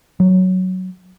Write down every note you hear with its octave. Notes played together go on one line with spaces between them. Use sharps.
F#3